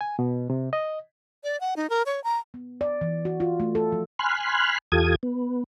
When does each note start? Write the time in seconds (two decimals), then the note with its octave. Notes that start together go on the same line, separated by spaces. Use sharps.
0.01 G#5
0.19 B2
0.50 C3
0.73 D#5
1.44 D5
1.61 F#5
1.76 D#4
1.90 A#4
2.06 C#5
2.24 A#5
2.54 B3
2.81 D5
3.01 E3
3.25 F#4
3.40 F4
3.60 A3
3.75 A4
3.92 F3
4.19 G#5 B5 C6 F6 F#6
4.92 E2 F4 G4 A4 D#6 G#6
5.23 B3